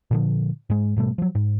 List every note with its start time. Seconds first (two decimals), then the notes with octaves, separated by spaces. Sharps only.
0.11 A#2 D3 F3
0.70 G#2 G#3
0.96 G#2 B2 G3 A3
1.18 F3 F#3
1.35 G#2